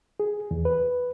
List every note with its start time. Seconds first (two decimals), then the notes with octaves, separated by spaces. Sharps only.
0.20 G#4
0.51 E2
0.65 B4